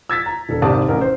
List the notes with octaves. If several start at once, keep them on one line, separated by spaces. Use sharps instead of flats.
E6 G#6 A6 B6
A#5
E1 A4
G#1 C3 D#3 D5 A5 D#6
A1 A#4
C5